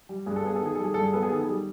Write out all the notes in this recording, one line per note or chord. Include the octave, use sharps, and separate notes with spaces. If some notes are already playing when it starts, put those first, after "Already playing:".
G3
G2 G#4
A4
B3 G#4
A4
D#3 G#4
G3 A4
G#4
G2 A4
G#4
B3 A4
G#4
D#3 A4
G#4
G3